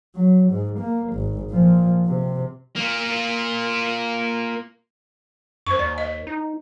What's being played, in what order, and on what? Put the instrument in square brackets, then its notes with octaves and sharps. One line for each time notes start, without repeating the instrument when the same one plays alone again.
[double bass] F#3
G#2
A#3
G#1
A#2 F3
C3
[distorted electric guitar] A#3 F4
[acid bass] F#2 [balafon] C5 C#6
[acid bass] D#2 [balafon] D5
[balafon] D#5
[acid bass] D#4